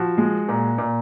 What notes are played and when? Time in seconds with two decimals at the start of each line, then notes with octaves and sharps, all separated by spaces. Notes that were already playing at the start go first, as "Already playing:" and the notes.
Already playing: F3 F#4
0.18 G#3
0.48 A#2
0.78 A#2